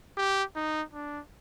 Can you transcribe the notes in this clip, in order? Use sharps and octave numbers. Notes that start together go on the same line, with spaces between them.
G4
D#4
D4